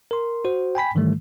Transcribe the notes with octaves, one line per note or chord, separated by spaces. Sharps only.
A#4 C6
F#4 C5
G5 G#5 B5 B6
G#2 D#3 E3 G3 A3